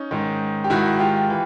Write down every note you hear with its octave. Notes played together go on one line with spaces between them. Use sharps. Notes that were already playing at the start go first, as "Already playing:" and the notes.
Already playing: C#4 D#4
G#2 D#3
G4
G#2 D#3 E4 F#4
F4 G4
E3